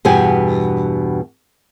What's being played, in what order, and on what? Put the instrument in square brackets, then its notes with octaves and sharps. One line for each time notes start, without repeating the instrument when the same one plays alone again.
[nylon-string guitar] E2 G2 B2 B3 G4 G#5